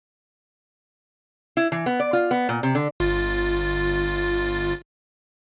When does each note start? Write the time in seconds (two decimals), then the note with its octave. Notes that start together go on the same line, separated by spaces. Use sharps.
1.57 E4
1.72 E3
1.86 B3
2.00 D5
2.13 F4
2.31 B3
2.49 A#2
2.63 C3
2.75 D3
3.00 G1 F4 A6